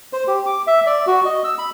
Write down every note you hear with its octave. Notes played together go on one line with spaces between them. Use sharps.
C5
G4
D6
E5
D5
F#4
D#5
E6
B5